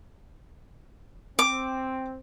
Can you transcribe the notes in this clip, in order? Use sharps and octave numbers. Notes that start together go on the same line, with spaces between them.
C4 D6